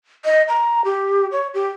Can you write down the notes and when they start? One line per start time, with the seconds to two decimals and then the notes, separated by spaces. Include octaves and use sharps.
0.25 D#5
0.48 A#5
0.85 G4
1.32 C#5
1.54 G4